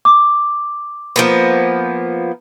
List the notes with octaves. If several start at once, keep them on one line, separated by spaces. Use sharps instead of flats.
D6
F3 A#3 B3